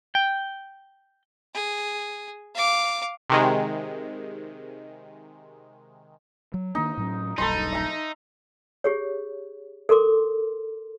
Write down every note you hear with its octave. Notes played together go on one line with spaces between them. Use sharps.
G5
G#4
F5 D6
C3 D#3 G#3
F#3
D#3 A#3 D4 D#4
A2 F#3 C#4
D#1 B1 G2 D#4 A4 B5 C6
E5 A#5
G4 G#4 C#5
A4 A#4 C6 D6